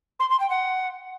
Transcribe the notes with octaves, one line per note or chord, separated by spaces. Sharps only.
C6
C6
G5
F#5